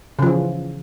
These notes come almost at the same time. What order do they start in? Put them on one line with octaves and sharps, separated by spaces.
C#3 F3 E3